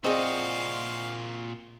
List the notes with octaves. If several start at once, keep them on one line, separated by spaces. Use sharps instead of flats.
A#2 C4 F#4 G#4 D5 D#5 F5 C6